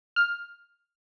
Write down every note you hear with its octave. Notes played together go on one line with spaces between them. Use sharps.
F6